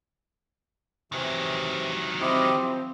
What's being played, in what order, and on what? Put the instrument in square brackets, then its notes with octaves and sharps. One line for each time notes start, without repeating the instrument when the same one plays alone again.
[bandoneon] C3 E3 [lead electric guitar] D#3 F#3
[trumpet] C4 [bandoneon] E4 G4 D#5
[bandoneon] F3